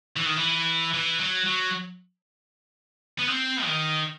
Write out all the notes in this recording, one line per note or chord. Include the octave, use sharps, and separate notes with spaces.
E3
D#3
E3
E3
F#3
F#3
B3
C4
D#3